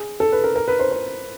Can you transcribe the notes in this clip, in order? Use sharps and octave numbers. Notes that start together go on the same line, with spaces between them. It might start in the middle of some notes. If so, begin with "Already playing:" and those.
Already playing: G#4
A4
B4
A#4
A#4
B4
C5
C5